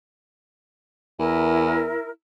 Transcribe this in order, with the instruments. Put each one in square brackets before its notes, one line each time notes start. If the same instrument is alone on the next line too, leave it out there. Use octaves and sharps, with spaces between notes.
[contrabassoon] E2 [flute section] E4 A#4